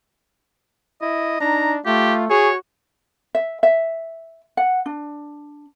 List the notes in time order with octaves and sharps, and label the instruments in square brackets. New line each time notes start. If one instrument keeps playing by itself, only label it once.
[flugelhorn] E4 [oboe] D#5
[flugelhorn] D4 [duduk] D#4 [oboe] A#5
[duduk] A3 [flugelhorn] F4 [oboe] G4
[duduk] F#4 [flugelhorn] G#4 [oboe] C#5
[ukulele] E5
E5
F#5
D4